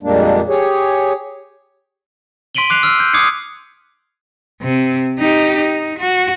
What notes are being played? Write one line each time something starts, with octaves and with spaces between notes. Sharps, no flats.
F2 A#2 G3 G#3 A#3 D4
G4 G#4 C#5
C6 B6 D7 D#7 F#7 G7
D6 F#6 C7 F7
E6 F6 C7
G6
D6 D#6 G#6 C7 C#7
C3
D#4 G4
D#4
F#4